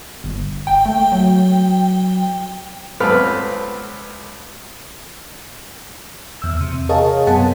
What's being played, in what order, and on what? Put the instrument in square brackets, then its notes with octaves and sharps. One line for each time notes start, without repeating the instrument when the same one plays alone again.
[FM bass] G1
[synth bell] G5
[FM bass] A3
F#3
[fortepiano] C#2 B3 C4 A4 B4 F6
[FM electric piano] E2 E6
C3
G#4 A#4 C#5 D#5 F5 A5
F#2 C3 B3 G#4 F#5 A5